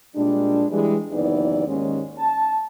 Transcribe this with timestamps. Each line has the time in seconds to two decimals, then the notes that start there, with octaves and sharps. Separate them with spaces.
0.15 A#2 G3 G#3 D4
0.70 E3 G3 G#3
1.11 F#1 D#2 E3 B3 D#4 D5
1.65 D#2 G#2 G#3 C#4
2.17 A5